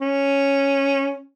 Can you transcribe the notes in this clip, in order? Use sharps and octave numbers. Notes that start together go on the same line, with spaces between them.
C#4